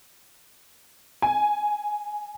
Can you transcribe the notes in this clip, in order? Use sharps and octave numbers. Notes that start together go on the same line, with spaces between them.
G#5